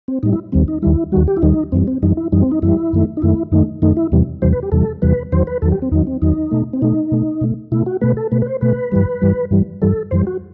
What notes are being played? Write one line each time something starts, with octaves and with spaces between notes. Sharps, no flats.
C4
A2 G3 D#4
E4
D#2 D#3 G3 C4
D#4
D#2 D#3 G3 E4
D#2 D#3 G3 F#4
G4
E4
D#2 D#3 G3 D#4
F#2 E3 G3 C4
C4
F#2 E3 G3 D#4
E4
F#2 E3 G3 D#4
C4
D#4
F#2 E3 G3 E4
F#2 D#3 A3
D#4
F#2 D#3 A3 E4
F#2 D#3 A3 D#4
F#2 D#3 A3 D#4
E4
E2 C3 E3 G3
E2 C3 E3 G3 C5
B4
G4
E2 C3 E3 G3 A4
E2 C3 E3 G3 B4
E2 D#3 F#3 C5
B4
E2 D#3 F#3 A4
G4
C4
E2 D#3 F#3 D#4
C4
E2 D#3 F#3 D#4
B2 A3
C4
B2 A3 D#4
B2 A3
B2 A3
B2 A3 E4
F#4
B2 A3 B4
A4
B2 A3 B4
B4
C5
B2 A3 B4
G2 E3 G3
G2 E3 G3
G2 E3 G3
G2 E3 G3 A4
F#2 E3 G3 C5
F#4